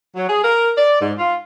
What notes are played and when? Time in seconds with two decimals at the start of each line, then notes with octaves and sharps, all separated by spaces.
0.16 F#3
0.29 G#4
0.44 A#4
0.77 D5
1.01 G#2
1.19 F4